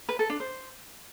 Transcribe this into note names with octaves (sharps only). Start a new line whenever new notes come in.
B4
A4
D4
C5